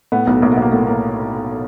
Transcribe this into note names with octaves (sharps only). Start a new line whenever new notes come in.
A2 B3
B1 B3
B1 A#3
B3
B1 A#3
A2 B3
A#3